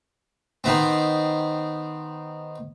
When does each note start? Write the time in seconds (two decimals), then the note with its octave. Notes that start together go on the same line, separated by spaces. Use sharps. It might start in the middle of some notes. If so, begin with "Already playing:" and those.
0.64 D#3 B3 C4